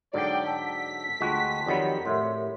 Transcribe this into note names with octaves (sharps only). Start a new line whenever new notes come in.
G#2 D3 F#3 D5 G5
A5 E6 B6
D2 G#3 F4 F#4 G5 A5 C6
F2 D#3 F#3 G4 C#5 D5 F#5 B5
A2 A#4 E5 C6